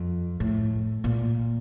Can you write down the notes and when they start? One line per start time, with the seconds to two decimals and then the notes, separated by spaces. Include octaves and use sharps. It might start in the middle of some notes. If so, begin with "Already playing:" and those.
Already playing: F2
0.40 A2
1.04 A#2